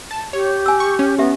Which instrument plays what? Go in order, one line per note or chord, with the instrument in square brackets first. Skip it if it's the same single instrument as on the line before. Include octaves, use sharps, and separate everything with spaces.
[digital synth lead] A5
[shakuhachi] G4 [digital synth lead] C#5
[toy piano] G#5 E6
[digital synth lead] C#6
C#4
[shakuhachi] B3 [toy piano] G4 E5